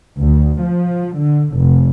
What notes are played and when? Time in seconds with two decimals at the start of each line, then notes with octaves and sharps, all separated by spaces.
0.17 D2
0.63 F3
1.18 D3
1.57 F1